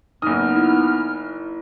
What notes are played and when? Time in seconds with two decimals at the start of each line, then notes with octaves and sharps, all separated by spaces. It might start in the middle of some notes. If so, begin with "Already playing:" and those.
0.22 F#1 B3 D#4 D#6 F6
0.56 E4